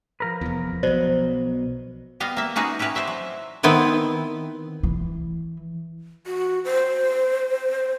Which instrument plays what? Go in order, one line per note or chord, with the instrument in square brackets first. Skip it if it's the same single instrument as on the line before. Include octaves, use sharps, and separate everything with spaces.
[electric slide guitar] F3 A#4 B4
[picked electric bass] F1 E2
[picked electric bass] B1 B2 [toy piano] C5 D5
[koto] G3 B3 D#5 F5
A#3 E5
C#4 D#4 F#4 G#4 B4
C#4 E4 G4 B4 C#5
C5 D5 E5 F#5
F#3
D#3 B3 C4 E4 B4
[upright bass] E3
[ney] F#4
C5